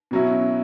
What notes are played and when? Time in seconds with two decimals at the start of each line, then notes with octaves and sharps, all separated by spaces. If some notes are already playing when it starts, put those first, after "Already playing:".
0.11 B2 F#3 C#4 E4